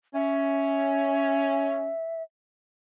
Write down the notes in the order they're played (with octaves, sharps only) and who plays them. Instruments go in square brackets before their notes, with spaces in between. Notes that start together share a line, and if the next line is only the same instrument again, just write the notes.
[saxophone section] C#4 [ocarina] E5